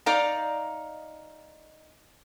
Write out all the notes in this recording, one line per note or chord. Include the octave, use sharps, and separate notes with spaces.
D#4 D5 F5 A#5